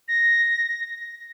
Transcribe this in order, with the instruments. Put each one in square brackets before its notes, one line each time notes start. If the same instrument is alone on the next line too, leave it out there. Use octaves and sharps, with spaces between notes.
[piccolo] A#6